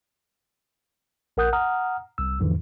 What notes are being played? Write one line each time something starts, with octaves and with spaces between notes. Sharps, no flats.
A#1 A#4 F#5 D#6 F#6 G6
F#5 A#5 D#6 F6
C2 E6
E2 G#2 D3 E3 F3